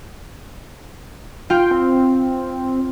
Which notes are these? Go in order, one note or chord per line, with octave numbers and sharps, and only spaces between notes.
F4 G5
C4